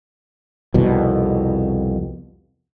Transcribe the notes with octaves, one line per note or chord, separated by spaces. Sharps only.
C2 F2 B2